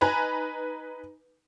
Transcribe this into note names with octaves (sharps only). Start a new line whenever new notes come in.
D#4 B4 G#5 A#5 B5